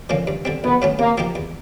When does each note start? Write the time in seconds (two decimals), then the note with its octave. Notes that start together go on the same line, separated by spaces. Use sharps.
0.09 D3 F3 A#3 C#4
0.27 G2
0.45 D3 G3 C4
0.64 A#1 B3
0.82 A2 F#3 A3 C#4
0.99 C3 A#3
1.18 F3 A#3 D#4 G4
1.35 E2